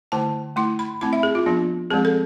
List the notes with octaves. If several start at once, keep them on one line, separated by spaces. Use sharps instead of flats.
D3 A3 E4 A5
A3 E4 C6
B5
A3 C4 E4 B5
E5
G#4
F4
F3 B3 D4
F3 G#3 C4 G#4
A4